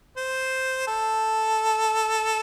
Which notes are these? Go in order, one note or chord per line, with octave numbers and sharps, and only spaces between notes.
C5
A4